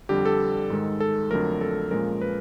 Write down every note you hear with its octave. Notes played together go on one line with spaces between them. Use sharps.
F2 D3 G3 G4
A4
G#2 D#3 G#3
A4
F2 D3 F#3 A3 A#4
A4
A#2 F3 G#3 C#4 A#4
B4